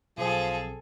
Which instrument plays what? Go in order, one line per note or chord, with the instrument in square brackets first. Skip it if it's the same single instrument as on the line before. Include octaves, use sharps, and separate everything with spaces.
[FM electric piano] B1 C4 [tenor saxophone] F3 [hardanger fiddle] G#4 A4